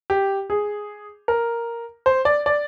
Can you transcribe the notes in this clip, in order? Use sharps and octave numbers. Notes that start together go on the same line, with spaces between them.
G4
G#4
A#4
C5
D5
D5